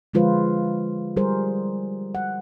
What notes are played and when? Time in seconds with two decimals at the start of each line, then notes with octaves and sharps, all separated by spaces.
0.14 D3 F3 G#3 F4 B4 C5
1.17 G3 G#4 A#4 C5
2.15 F#5